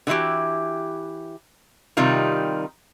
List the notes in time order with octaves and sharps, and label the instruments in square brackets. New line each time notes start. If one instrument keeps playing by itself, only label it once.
[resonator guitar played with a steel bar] D3 E3 E4 F#4 G4
C3 D#3 G3 D#4 F4